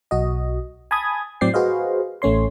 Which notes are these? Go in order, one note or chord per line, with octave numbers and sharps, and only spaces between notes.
B1 F#4 D#5
G#5 A5 B5 D#6 G#6
A2 F#3 C4 D5 G5 C7
F#4 G#4 B4 C5 D#5 F5
A1 A3 C#4 C#5 C6